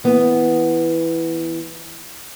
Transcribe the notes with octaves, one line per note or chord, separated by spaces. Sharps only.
E3 B3